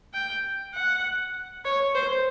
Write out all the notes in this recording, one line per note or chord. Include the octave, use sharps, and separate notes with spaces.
G5
F#5
C#5
C5